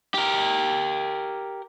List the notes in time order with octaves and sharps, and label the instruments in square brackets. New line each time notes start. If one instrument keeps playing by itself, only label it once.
[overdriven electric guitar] G4 A#4